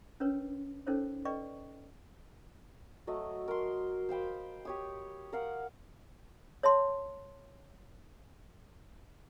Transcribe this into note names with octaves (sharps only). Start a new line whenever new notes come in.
C#4 D4 A#4 B4 C#5
C#4 D#4 A4 A#4 C5 C#5
A4 B4 D5 D#5 G5 C#6
F#3 A3 D#5
A#4 C6
C5 F5 G5 B5
G4 C#5 D#6
A#4 F5 F#5 A#5
C#5 E5 A5 C6